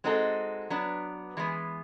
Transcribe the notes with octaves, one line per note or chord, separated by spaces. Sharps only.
G#3 C4 D#4 F#4 A4
F#3 B3 D4
E3 G#3 B3